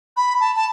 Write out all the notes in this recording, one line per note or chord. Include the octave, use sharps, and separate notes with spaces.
B5
A5
A5